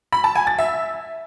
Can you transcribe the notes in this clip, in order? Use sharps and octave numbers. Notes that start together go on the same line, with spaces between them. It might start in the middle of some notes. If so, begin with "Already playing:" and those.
B5
A5
G#5
A6
E5